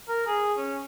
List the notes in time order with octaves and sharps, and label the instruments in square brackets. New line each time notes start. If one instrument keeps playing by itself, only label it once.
[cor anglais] A#4
G#4
C#4